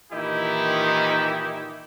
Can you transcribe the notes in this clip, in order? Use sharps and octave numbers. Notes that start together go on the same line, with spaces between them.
A#2 D#3 E3 D#4 E4 G4